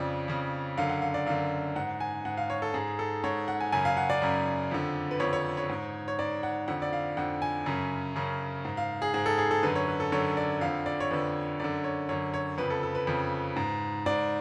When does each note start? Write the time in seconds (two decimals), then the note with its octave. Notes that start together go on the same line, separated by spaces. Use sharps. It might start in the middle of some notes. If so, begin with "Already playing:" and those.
Already playing: F2 C#3 D5
0.28 F2 C#3
0.77 F#2 D3 F5
0.89 F#5
1.02 F5
1.14 D5
1.26 F#2 D3 F5
1.76 G#2 F#5
2.00 G#5
2.25 G#2 F#5
2.37 F5
2.50 C#5
2.62 A4
2.74 G#2 G#4
2.99 A4
3.24 G#2 C#5
3.48 F#5
3.61 G#5
3.72 F#2 C#3 G#5
3.85 F5
3.97 F#5
4.10 D5
4.22 F#2 C#3
4.71 F2 D3
5.11 B4
5.20 F2 D3 C#5
5.33 C#5
5.57 C#5
5.69 G#2
6.08 C#5
6.19 G#2 D5
6.43 F#5
6.68 F2 D3 F#5
6.82 D5
6.93 F5
7.17 F2 D3 F#5
7.42 G#5
7.66 F#2 C#3
8.16 F#2 C#3
8.65 G#2
8.77 F5
9.02 G#4
9.14 G#2 G#4
9.26 A4
9.38 G#4
9.51 A4
9.63 F#2 D3 B4
9.75 C#5
9.88 B4
10.00 A4
10.12 F#2 D3 C#5
10.37 D5
10.61 F2 D3 F5
10.86 D5
11.00 C#5
11.11 F2 D3 B4
11.60 F#2 D3 D5
11.84 C#5
12.09 F#2 D3 C#5
12.34 C#5
12.58 F2 C#3 B4
12.70 A4
12.83 A4
12.95 B4
13.07 F2 C#3
13.56 G#2
14.06 G#2 D5